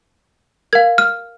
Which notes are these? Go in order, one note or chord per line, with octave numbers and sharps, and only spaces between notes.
A#4 F5 G#6
F6